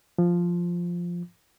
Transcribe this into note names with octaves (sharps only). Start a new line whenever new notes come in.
F3